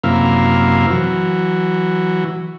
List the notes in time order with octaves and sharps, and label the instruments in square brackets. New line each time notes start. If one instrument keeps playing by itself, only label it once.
[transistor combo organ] F#2 C3 A#3 E4 F5
E3 F#3